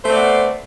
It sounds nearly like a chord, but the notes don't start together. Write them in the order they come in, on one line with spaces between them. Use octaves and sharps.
C5 A3 C4 D5 B3